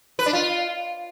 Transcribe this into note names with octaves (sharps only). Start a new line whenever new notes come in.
B4
D4
F4